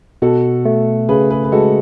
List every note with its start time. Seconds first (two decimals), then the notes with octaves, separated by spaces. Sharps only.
0.22 B2 F#4 A4
0.65 A3
1.09 C#3 G#4 B4
1.30 G#4 B4
1.44 B4
1.52 G#3 F#4 A4